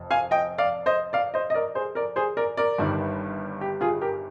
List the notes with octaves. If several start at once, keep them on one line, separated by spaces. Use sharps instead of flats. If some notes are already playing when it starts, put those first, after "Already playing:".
Already playing: F1 F2
F5 G#5
D#5 G5
D5 F5
C5 D#5
D5 F5
C5 D#5
D#5
A#4 D5
G#4 C5
A#4 D5
G#4 C5
A#4 D5
A#4 D5
G1 G2 D#3 G3
G4
F4 G#4
G4 A#4